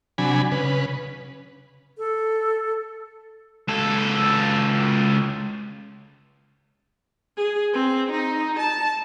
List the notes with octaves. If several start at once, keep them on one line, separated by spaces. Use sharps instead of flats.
C3 F#3 D4 G#5 B5
C#3 B4
A4
C#2 A4
G#4
C4
D#4
A5